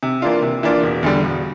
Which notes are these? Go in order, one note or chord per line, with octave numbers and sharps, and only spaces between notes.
C3
E3 A#3 D4 F4
C3
E3 A#3 D4 F4
E1
E2 D3 G3
E1